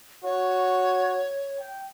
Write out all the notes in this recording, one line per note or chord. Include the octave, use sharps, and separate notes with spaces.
F#4 C#5
G5